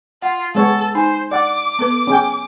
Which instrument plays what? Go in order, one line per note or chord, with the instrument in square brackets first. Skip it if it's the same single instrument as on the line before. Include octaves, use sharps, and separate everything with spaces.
[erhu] F4 [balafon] F#5
[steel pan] G#3 B3 C#5 [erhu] A4
[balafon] D#4 G#5 [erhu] C5
[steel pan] D5 F#5 [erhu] D6
[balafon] B3 A4 B4
[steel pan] C#4 G#4 G5